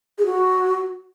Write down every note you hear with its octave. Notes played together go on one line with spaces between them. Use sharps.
G#4
F#4